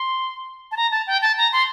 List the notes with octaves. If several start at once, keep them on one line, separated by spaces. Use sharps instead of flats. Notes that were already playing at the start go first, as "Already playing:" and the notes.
Already playing: C6
A5
A#5
A5
G5
A5
A#5
C6